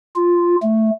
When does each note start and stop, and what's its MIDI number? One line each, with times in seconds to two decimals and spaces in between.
0.16 0.56 65
0.63 0.91 57